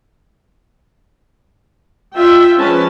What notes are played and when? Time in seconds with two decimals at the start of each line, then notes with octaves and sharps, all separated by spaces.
2.15 F4 E5 G5
2.57 F3 G#3 C#4 B4 A5